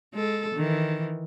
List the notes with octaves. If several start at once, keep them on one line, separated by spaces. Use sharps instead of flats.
G#3 A4
D#3 E3